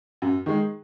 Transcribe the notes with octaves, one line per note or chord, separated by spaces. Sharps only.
F#2
D#3 G#3